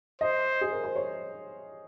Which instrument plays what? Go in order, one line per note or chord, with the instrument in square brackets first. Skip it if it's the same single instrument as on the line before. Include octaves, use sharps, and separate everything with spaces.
[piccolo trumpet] C5 [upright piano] D#5
[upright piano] G#4
A#4
C5
C#5